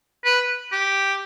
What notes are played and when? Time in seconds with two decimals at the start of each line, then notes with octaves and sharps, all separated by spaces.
0.25 B4
0.72 G4